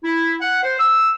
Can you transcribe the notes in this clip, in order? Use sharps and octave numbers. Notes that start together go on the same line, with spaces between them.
E4
F#5
C5
E6